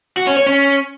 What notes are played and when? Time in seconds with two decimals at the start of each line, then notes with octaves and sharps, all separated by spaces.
0.17 F#4
0.27 C#4
0.37 C#5
0.47 C#4